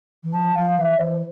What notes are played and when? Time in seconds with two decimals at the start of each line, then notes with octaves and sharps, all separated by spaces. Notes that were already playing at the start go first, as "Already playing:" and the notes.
0.23 E3
0.33 F3 A5
0.55 F3 F5
0.77 E3 E5 F5
0.99 E3 C5